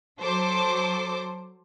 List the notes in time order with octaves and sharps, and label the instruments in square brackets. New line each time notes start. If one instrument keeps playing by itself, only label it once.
[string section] F#3 A4 C5 D6